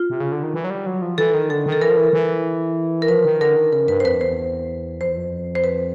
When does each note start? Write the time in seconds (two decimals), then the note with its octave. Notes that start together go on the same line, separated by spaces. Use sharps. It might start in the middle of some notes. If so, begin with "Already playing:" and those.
Already playing: F4
0.10 C3
0.20 C#3
0.32 D3
0.43 D#3
0.54 E3
0.64 F#3
0.70 G3
0.86 F#3
1.02 F3
1.18 E3 A4
1.34 D#3
1.50 D3 A4
1.66 D#3
1.72 A4
1.81 E3 A#4
1.89 F3
1.97 E3
2.13 E3
3.02 A#4
3.08 F3 B4
3.25 D#3
3.41 D3 A#4
3.56 D#3
3.72 C#3 A#4
3.88 G2 B4
4.00 C5
4.04 F2 B4
4.21 E2 C5
5.00 F2 C5
5.09 E2
5.17 F2
5.55 C5
5.64 B4